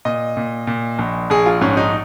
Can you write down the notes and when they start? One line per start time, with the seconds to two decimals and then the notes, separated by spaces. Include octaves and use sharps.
0.05 A#2 D#5
0.37 A#2
0.67 A#2
0.99 A#1
1.30 A#1 G#4
1.46 F4
1.61 G#2 C#4
1.77 D#4